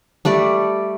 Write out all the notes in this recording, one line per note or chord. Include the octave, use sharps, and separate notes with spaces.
G3 A3 D5